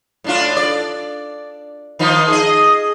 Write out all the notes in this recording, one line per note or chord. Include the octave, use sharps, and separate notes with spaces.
A2 D4 F4
D5
D#3 F3 D#4
G#4 D#5